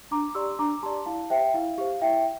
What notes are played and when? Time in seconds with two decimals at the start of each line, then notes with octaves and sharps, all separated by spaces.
0.11 D4 A#5 D6
0.35 G4 D5 C6 E6
0.59 D4 A#5 D6
0.83 G4 D5 A5 C6
1.06 E4 F5 A5
1.30 G4 C5 E5 G5
1.54 E4 F5
1.78 G4 C5 F5
2.01 E4 E5 G5